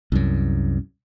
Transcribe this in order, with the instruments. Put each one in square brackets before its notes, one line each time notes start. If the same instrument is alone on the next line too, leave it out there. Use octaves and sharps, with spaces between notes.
[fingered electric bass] C2 F#2